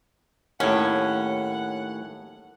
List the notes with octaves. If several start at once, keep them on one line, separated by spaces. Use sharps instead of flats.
D#2 A2 C#4 F#5